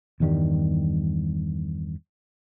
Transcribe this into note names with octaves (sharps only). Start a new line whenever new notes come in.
E2 G2 D#3 G3